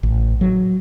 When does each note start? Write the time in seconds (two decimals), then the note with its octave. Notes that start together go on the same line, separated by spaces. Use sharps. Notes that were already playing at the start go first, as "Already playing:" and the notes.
0.03 A1
0.41 F#3